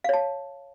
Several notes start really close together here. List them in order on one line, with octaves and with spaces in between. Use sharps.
F5 C#5 A5